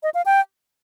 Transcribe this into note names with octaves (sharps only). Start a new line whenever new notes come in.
D#5
F5
G5